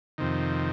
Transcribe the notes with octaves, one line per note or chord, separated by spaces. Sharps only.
F2 C3 D#3